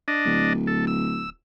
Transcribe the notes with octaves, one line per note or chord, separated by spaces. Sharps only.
D4 D#5
D1
A4
E6